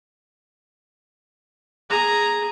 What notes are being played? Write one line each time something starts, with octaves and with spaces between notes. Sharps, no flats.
G#4 A#5